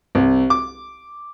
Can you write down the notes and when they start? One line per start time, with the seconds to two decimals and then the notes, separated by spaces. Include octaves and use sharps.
0.15 C2
0.50 D6